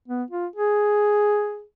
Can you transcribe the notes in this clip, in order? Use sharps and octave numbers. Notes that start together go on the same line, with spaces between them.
B3
F4
G#4